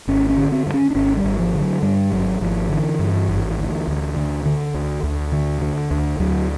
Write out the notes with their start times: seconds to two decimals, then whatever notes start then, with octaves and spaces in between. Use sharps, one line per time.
0.08 G#1 C#4
0.30 C#4
0.37 D3
0.52 C4
0.66 G2
0.74 C#4
0.90 D4
0.95 G#1 C#4
1.17 G3
1.24 G#1
1.39 F3
1.54 D3
1.61 F#3
1.82 G2 G3
2.12 G#1 F#3
2.41 G#1 F3
2.70 D3 E3
2.99 G2
3.28 G#1
3.57 D2
3.87 D2
4.16 D3
4.45 D3
4.74 D2
5.03 D2
5.32 D3
5.61 D3
5.91 D2
6.19 D2 F#3